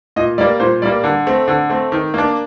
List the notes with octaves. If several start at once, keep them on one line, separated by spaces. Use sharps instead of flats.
A#2 D#5
G3 A#3 D5
A#2 C5
G3 A#3 D5
D3
A3 C4
D3
A3 C4
D#3
A#3 D4